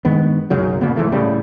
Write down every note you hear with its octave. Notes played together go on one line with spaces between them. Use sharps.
G2 D#3 G#3 B3
B1 F#2 C#3 F#3
A#2 C#3 A#3 B3
D1 G#2 E3 A3
A2 C#3 G3